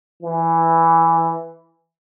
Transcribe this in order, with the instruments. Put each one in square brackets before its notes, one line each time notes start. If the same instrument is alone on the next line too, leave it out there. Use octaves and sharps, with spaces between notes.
[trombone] E3